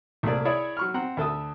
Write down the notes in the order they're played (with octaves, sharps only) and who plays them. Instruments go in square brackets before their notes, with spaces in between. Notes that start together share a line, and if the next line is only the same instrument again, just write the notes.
[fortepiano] C2 A3 A#3 G#4 D5
E4 G#4 C#5 D5 E5
F#3 C#6 F6
C4 F#5 A#5
D2 A4 E5 D#6